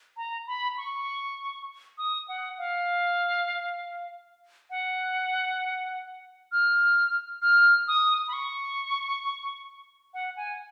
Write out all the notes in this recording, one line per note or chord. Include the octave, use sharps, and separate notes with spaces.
A#5
B5
C#6
D#6
F#5
F5
F#5
F6
F6
D#6
B5
C#6
F#5
G#5